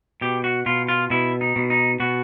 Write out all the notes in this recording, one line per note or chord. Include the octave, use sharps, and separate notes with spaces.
B2 G4
F#4
B2 F4
F4
B2 E4
D#4
B2
D#4
B2 F#4